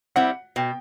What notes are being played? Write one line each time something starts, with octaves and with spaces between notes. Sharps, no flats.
G3 C4 E4 F#5
B2 G5